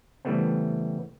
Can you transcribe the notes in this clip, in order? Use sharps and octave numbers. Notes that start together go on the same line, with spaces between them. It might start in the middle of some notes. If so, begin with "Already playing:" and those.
C#3 E3 G3 A3 B3 C4